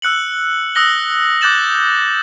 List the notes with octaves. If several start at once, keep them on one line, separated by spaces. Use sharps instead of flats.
E6 F#6 C#7 F#7
D#6 E6 F#6 A#6 F#7 G7
D6 F#6 G6 A6 E7 F#7